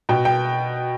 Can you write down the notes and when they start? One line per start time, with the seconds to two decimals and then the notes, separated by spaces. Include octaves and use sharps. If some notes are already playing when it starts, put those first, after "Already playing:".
0.09 B2 G5
0.25 G5